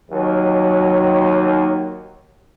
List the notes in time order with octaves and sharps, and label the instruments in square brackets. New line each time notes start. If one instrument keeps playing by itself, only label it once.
[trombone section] D#2 [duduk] F#3